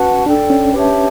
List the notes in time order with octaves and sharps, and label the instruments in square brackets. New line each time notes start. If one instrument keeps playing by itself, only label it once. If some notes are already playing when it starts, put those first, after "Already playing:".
Already playing: [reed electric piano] C#4 [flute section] F#4 B4 F#5 A5
[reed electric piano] D4 [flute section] A4 D5 G5
[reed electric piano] C#4
[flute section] G4 C#5 E5 A5 [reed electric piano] B4